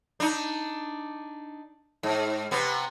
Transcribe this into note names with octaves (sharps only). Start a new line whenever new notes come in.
D4 D#4
G#2
C3 B3